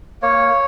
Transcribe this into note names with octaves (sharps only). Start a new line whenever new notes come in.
A#3 C#5